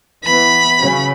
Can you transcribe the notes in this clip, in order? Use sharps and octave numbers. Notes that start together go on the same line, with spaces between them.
E3 B3 B5
C#3 F#3 C#4